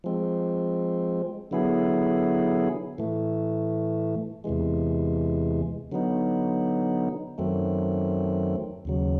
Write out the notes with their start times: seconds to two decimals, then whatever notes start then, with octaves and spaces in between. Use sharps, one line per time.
0.04 F3 G#3 C4
1.51 D3 F#3 B3 E4 G#4
2.98 A2 E3 A3
4.44 E2 C3 E3 G#3
5.92 D3 F#3 B3 D#4
7.38 F#2 D#3 F#3 A3 C4
8.85 D#2 C#3 F#3